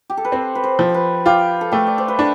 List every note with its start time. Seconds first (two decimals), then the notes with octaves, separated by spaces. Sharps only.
0.10 G4
0.17 A4
0.25 B4
0.32 C4 C5
0.55 B4
0.64 C5
0.79 F3
0.89 A4 B4
1.26 F4 G4
1.61 A4
1.72 A3 G4
1.87 D5
1.98 C5
2.08 B4
2.19 D4 A4